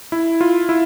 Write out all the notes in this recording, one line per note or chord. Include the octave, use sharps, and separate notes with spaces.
E4
F4
E4